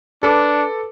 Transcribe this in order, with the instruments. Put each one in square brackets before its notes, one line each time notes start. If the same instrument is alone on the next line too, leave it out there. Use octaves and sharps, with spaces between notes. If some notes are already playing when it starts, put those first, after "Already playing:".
[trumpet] D4 [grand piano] A4 B4 D6